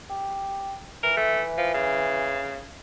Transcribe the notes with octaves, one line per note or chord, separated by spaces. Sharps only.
G4
E3 A#4
A3
F3
C#3